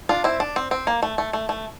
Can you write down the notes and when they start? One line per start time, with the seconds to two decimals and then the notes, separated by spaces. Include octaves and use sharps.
0.09 D4 F4
0.24 C4 E4
0.40 D4
0.56 C4
0.71 C4
0.87 A#3
1.02 A3
1.18 A3
1.33 A3
1.49 A3